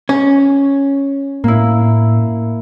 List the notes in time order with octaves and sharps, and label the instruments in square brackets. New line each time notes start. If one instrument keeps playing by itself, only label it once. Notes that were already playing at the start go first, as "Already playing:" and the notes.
[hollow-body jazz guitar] C#4
[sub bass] A2 [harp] A#3 E4